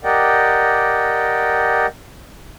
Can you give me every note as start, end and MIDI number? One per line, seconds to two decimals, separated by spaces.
0.04 1.86 67
0.04 1.86 70
0.04 1.86 74
0.04 1.86 75
0.04 1.86 78
0.04 1.86 79